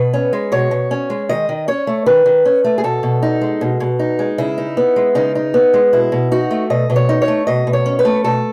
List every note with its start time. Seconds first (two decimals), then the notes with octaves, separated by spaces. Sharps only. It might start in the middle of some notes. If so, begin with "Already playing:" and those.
Already playing: B2 B4
0.13 C#4
0.33 G#3
0.52 B2 C#5
0.71 B2
0.91 C#4
1.10 G#3
1.29 D#3 D#5
1.49 D#3
1.68 C#4 C#5
1.87 A3
2.06 D#3 B4
2.26 D#3
2.45 C#4
2.64 A3
2.78 G#4
2.84 B2 A4
3.03 B2
3.23 D#4
3.41 G#3
3.61 B2
3.80 B2
3.99 D#4
4.19 G#3
4.38 C#3 E4
4.58 D#4
4.77 B3
4.96 G#3
5.15 C#3 D#4
5.35 D#4
5.54 B3
5.74 G#3
5.93 B2 E4
6.12 B2
6.31 D#4 F#4
6.51 A3
6.70 B2 D#5
6.90 B2
6.96 C#5
7.09 D#4
7.22 C#5
7.28 A3
7.47 B2 D#5
7.67 B2
7.73 C#5
7.86 C#4
7.99 B4
8.05 A3
8.24 B2 A4